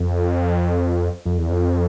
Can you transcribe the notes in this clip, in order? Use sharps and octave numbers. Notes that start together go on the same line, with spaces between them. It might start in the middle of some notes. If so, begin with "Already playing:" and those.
Already playing: F2
F2
E2
F2